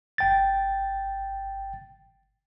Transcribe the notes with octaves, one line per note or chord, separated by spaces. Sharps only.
G1 G5 A6